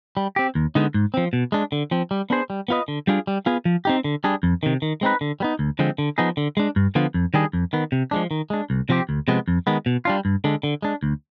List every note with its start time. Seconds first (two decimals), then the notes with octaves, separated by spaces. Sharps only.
0.17 G3
0.36 C4 G4
0.55 D#2
0.75 D3 G#3 B3 D#4
0.94 G#2
1.14 F3 C4
1.33 B2
1.52 G#3 D4
1.72 D3
1.91 F3 C4
2.11 G3
2.30 B3 D4 G#4 C5
2.50 G3
2.68 B3 F4 B4 D#5
2.88 D3
3.07 G3 D4 F4 G#4
3.27 G3
3.46 B3 F4 G#4
3.65 F3
3.85 C4 D#4 G4
4.04 D3
4.24 G3 D4 G#4
4.43 F2
4.63 C3 D#3
4.82 D#3
5.01 G#3 C4 D#4 B4
5.21 D3
5.40 G3 B3 D#4
5.59 D2
5.79 D3 F3 G#3 C4
5.98 D3
6.18 F3 B3 D#4 G#4
6.37 D3
6.57 G#3 D4
6.76 G2
6.95 D3 F3 B3 F4
7.14 F2
7.34 D#3 G3 D4 G#4
7.53 F2
7.73 D#3 B3
7.92 C3
8.11 F3 G#3 D4
8.31 D#3
8.50 G#3 D4
8.70 C2
8.89 C3 F3 C4 G4
9.09 D2
9.28 C3 F3 G#3 B3
9.48 F2
9.67 D#3 G#3 B3
9.86 B2
10.05 G3 D4 F4
10.25 G2
10.44 D3 G#3 D4
10.63 D3
10.82 G#3 D4
11.03 D2